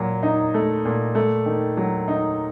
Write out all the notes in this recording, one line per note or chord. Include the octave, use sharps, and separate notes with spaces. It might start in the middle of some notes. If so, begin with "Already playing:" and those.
Already playing: A#2 F#3
D#4
A3
A#2
A3
D#3
F#3
D#4